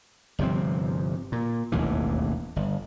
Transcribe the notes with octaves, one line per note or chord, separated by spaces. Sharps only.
G1 C3 F3 C4
A#2
E1 A1 D#2 E3
G1